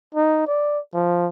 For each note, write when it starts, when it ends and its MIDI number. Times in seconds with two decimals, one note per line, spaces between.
0.15 0.47 63
0.47 0.79 74
0.94 1.28 53